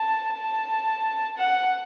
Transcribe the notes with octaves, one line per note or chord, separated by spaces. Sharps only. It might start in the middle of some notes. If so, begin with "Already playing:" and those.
Already playing: A5
A5
F#5